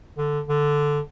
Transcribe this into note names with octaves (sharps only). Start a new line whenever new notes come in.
D3
D3